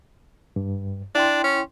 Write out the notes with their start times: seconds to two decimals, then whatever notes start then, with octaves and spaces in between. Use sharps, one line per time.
0.56 G2
1.15 D4 E4 G5 C6
1.44 C#4